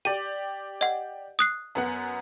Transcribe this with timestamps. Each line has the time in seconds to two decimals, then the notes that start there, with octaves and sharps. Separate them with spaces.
0.05 G4 D5 D#7
0.81 D#5 F#5
1.39 D#6 F#6 C7
1.75 F#2 B3 F#5